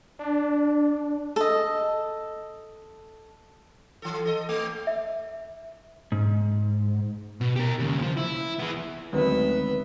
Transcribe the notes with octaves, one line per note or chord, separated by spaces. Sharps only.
D4
A4 D#5
E3 A4
A4 D#5
A3
E5
G#2
B2
G4 A#4
D#2 C#3
F3 C5
E4
B3 G#4
D2 D#3 F#3 G#3 B3 C4 B4 E5